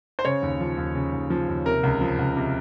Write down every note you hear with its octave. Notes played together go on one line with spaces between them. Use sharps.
C5
C#3 C#5
D#2
F3
D#2
C#3
D#2
F3
D#2
C3 A#4
C#2
F3
C#2
C3